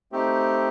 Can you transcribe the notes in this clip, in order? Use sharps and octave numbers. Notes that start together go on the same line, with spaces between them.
A3 C4 D#4 G4